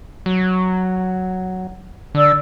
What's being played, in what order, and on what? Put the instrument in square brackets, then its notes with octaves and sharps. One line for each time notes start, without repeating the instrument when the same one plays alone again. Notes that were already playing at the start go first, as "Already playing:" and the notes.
[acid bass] F#3
[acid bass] D3 [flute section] D5 E6